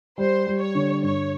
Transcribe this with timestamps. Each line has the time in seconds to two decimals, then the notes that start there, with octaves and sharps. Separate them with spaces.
0.18 G3 C5
0.47 G3
0.61 C#5
0.75 D3
1.03 G2 C#5